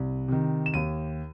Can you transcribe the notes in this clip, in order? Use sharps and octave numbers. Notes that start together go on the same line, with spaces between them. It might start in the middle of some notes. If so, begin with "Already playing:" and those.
Already playing: C2
C3 D#3
E7
D#2 D#7